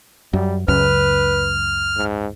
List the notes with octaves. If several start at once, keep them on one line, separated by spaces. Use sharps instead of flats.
F#2 G3
C#2 F#2 C#3 B4 F6
G#2